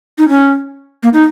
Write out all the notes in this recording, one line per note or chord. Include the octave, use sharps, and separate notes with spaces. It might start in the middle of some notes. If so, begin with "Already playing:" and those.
D#4
C#4
A#3
D#4